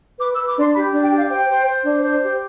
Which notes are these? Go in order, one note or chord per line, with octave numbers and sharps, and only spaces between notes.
B4 D6
E6
B4
D6
D4 C6
G4 B5
D4
G5
G4
F5
C5 G5
C5
C5
D4
C5
G4